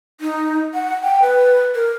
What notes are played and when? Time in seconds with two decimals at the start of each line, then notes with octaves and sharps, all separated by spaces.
0.21 D#4
0.74 F#5
1.04 G5
1.22 B4
1.75 A#4